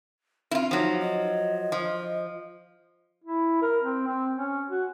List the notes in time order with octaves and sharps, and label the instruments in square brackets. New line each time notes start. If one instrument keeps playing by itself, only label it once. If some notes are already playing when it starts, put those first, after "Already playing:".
[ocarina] C4 [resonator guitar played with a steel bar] E4 F4
[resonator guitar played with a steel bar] F3 F#3 [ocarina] D#4
[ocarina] D#5
[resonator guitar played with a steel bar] F3
[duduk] E4
A#4
C4
C4
C#4
F#4